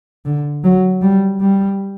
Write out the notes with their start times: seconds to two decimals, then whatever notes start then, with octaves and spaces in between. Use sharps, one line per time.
0.26 D3
0.64 F#3
1.02 G3
1.40 G3